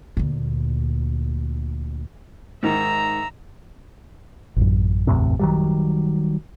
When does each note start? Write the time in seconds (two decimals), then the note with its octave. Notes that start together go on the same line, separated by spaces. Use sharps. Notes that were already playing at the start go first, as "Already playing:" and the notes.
0.17 D2 A#2
2.63 G#2 D#3 E5 A#5
4.56 A1 F#2
5.07 E2 A2 C3
5.39 D#3 F#3 G3